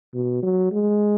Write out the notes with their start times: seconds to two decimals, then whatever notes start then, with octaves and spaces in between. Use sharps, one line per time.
0.14 B2
0.43 F#3
0.72 G#3